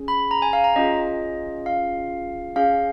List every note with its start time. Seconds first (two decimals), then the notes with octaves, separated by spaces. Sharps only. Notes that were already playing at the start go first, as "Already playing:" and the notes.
Already playing: C#4 G#4
0.08 B5
0.31 A#5
0.42 G#5
0.53 F5
0.64 A#5
0.76 C#4 F4 G#4 D#5
1.66 F5
2.56 C#4 G#4 F5